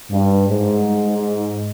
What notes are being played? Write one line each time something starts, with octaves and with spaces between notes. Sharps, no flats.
G2
G#2